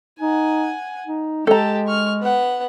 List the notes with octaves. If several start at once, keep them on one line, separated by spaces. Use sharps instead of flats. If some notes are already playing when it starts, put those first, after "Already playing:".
D#4 F#5 G#5
D#4
G#3 G4 A4 A5 A#5
C#6 F6
B3 F#5